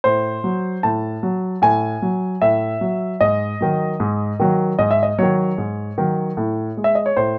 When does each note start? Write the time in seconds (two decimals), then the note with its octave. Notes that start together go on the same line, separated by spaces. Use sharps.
0.04 A2 C5
0.44 F#3
0.83 A2 A5
1.23 F#3
1.62 A2 G#5
2.02 F#3
2.42 A2 E5
2.81 F#3
3.21 G#2 D#5
3.61 D#3 F#3
4.00 G#2
4.40 D#3 F#3
4.79 G#2 D#5
4.91 E5
5.03 D#5
5.18 D#3 F#3 C#5
5.58 G#2
5.98 D#3 F#3
6.37 A2
6.77 G#3
6.84 E5
6.95 D#5
7.06 C#5
7.17 A2 C5